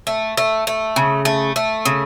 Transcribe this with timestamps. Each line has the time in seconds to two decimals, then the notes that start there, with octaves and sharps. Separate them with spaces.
0.07 A3
0.37 A3
0.67 A3
0.96 C#3
1.25 A3
1.56 A3
1.85 C#3